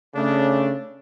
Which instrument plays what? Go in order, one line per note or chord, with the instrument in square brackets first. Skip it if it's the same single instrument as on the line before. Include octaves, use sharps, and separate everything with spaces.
[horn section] C#3 A3 D4